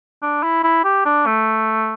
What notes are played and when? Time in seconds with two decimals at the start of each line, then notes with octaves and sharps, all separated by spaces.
0.22 D4
0.43 E4
0.64 E4
0.84 G4
1.05 D4
1.26 A3